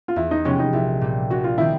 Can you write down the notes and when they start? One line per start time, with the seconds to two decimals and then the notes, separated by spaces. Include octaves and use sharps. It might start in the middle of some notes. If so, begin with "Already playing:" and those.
0.08 F4
0.16 E2 E4
0.31 D#4
0.44 C3 F3 G#3 B3 C#4
0.59 D#4
0.73 A#1 E4
1.01 A#2 G3
1.30 A#1 F#4
1.44 F4
1.58 D#3 G3 C4 E4